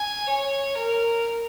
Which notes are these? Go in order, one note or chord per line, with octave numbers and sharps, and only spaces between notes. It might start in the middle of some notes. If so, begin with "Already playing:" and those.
Already playing: G#5
C#5
A#4